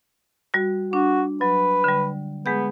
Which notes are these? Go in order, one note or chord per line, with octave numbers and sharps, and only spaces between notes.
G3 F#4
D4 F#4
F#3 B4
D3 G3
G#3 B3 G#4 G6